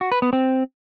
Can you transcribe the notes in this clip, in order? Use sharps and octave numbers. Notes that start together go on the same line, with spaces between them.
F#4
B4
B3
C4